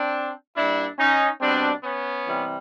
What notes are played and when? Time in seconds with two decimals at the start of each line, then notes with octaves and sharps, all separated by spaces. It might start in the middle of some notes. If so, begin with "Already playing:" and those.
Already playing: C4 D4
0.56 A#2 G3 D4 E4
0.99 C#4 D#4
1.41 B2 G3 C4 D4
1.84 B3 C#4
2.27 C3 E3 G3